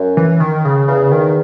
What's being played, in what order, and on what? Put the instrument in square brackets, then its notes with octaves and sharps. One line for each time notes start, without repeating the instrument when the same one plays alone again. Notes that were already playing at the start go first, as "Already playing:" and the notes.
Already playing: [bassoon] F#2
[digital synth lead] E3
D#3
C#3
[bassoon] E2 [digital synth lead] C#3
[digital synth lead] D#3